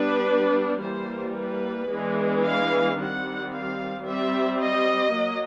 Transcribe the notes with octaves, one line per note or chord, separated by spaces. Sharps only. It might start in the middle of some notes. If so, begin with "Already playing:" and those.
Already playing: G3 B3 D4 B4
E3 G3 A#3 C5
B4
E3 G#3 B3 D4
F5
D#3 G3 C4 F#5
F5
G3 C4 E5
D#5
F#3 A#3